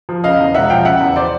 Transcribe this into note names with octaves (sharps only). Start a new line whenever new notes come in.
F3
C#3 D#5 F5
E2
E1 E5 F#5
F3 F5 G5
C#3 E5 F#5
E2
C5 D5